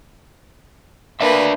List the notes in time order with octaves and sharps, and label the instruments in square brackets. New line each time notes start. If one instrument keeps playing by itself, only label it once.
[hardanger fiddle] A#3 B4 [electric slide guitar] D4 D5 E5